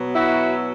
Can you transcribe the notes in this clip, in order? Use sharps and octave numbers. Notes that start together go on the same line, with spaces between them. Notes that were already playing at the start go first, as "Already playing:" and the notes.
Already playing: B2 F#3
E4 F#4